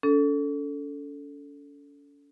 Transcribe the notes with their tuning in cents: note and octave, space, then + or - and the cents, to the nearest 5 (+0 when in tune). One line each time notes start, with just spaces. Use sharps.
C#4 +45 A4 +0